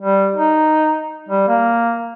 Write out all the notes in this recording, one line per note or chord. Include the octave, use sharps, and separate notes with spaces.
G3
D#4
G3
A#3